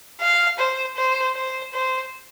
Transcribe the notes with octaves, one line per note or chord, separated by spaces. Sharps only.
F5
C5
C5
C5
C5